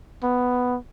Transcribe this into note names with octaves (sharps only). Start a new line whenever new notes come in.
B3